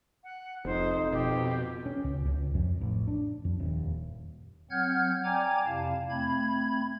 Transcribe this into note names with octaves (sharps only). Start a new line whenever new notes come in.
F#5
F1 F2 D#4 C5
B2 G4
C#4
C#2
C#2
F2
A1
D4
F2
D#1
F#3 C4 F#5 F6 G6 G#6
D5 G5 G#5 A#5 D6 G#6
F2 C3 E4 F5 A5
A3 C4 B5 G#6